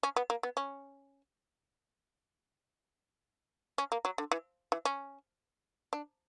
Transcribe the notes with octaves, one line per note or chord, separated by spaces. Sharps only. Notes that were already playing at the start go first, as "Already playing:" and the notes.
C#4
B3
A#3
B3
C#4
C#4
A#3
F#3
D3
E3
E3
C#4
D4